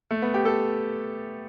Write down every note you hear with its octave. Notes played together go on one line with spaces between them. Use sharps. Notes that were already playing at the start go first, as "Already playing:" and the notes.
A3
B3
G4
A4